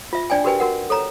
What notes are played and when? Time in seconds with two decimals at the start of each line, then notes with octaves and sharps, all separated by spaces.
0.13 F4 E5
0.30 D4 D5 G5 G#5
0.44 F#4 G4 A#4 B4 G5 G#5
0.60 F#4 A#4 F#5
0.90 A4 C#5 A#5